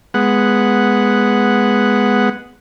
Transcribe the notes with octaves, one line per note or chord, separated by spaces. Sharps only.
G#3 B3 F#5